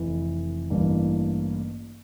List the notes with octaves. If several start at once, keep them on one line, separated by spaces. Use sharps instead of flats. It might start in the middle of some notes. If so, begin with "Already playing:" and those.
Already playing: F1 F2 E3
A1 G2 E3 A#3